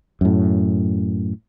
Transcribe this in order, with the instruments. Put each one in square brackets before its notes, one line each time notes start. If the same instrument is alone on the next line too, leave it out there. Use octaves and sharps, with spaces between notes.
[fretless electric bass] F#2 A2